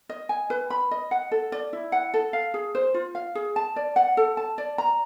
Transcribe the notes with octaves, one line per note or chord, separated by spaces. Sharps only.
D#5
G#5
B4
B5
D#5
F#5
A4
D5
E4
F#5
A4
F5
G#4
C5
F4
F5
G#4
A5
D5
F#5
A4
A5
D5
A#5